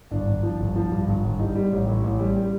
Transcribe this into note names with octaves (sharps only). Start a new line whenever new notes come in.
G1 D4
G1
F3
G1
F3
G2
G1
G1
G3 D#4
G3
A1
A2
A1
G3
G3